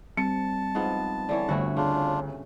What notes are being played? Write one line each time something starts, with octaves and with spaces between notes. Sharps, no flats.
G3 C4 A5 C#7
G#2 F3 B3
D3 E3 C#5
G1 D2 A3 E4 F#4
C#3 D4 F4